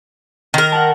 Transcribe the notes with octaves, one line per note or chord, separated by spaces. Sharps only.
D#3 A#4
F#5 A5